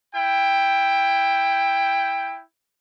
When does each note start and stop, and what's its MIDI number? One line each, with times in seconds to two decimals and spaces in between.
0.15 2.42 64
0.15 2.42 79